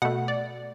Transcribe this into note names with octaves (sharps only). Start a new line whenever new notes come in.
B2 A3 F#5
D5